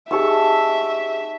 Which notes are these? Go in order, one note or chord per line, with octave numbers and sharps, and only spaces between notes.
D#4 G4 G#4 E5 A5 C#6 E6